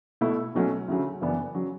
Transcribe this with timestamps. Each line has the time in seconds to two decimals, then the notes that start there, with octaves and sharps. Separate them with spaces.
0.21 B2 A3 E4
0.55 B1 B2 F#3 A3 C#4
0.88 D2 C#3 F#3
1.21 F#1 F#2 E3 B3 D4
1.55 C#3 F#3